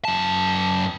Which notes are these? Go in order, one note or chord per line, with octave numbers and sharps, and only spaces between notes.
F#2 A5